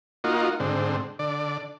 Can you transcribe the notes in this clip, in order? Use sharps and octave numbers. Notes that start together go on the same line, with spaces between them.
A#3 D#4 F4 F#4
G#2 D3 C4
D3 D5